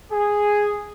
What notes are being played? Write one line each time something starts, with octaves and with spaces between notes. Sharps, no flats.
G#4